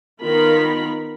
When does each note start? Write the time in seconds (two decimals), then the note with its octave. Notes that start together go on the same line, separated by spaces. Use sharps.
0.22 D#3 B3 F4 A#4 B5